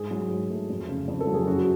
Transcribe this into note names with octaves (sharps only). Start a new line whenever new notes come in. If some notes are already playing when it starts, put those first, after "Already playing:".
Already playing: G#2 G#4
F#3
G#2
A3
F2
C#3
F2
A4
F#3
G#4
F#2 F#4